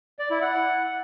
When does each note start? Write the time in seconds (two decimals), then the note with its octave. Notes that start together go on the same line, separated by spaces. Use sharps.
0.19 D5
0.30 E4
0.42 F#5